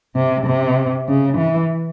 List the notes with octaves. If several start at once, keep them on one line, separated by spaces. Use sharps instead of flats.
C3
C3
C#3
E3